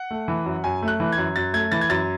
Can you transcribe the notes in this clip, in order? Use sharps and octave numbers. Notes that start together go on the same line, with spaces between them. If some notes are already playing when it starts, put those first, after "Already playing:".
Already playing: F#5
A3
E3
F#2
F#2 G#5
A3
F#6
E3
F#2 G#6
F#2 A6
A3 G#6
E3 A6
G#6
F#2 A6